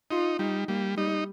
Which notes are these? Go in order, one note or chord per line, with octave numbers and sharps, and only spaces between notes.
D#4 F4
G3 D#4
G3 A#3
G3 D#4